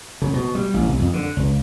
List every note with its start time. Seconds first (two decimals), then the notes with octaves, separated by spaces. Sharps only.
0.22 C#3
0.34 B2
0.55 G3
0.74 A1
0.87 C2
0.99 F2
1.13 D3
1.37 C#2